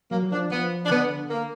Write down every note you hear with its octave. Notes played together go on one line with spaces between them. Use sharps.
F#3 A#3
F#3
F3 D4
F3 B3
D4
D3 B3
A#3